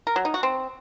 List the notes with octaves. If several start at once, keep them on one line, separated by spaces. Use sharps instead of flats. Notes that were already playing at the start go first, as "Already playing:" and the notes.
A#4
F#3
D#4
F#4
C4